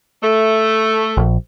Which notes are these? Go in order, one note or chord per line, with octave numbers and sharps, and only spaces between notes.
A3
A#1